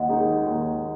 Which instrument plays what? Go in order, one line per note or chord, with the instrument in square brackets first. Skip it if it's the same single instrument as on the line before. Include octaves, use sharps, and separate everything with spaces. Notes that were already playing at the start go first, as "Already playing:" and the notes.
Already playing: [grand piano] D#2 [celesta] D#5 F#5
[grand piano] D#3 G#3 D#4
D#2